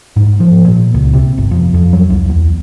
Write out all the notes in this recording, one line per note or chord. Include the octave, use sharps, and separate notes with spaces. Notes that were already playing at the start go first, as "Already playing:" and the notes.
G#2
F3
A#2
C#2
C3
G1
F2
F2
F#3
C2
E2